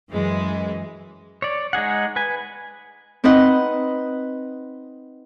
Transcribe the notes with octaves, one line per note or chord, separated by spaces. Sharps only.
F#2 E3 G#3
C#5 D5
G#3 D#4 G#4 F#5
B4 G#5
C4 D#4 B4 D#5 F#5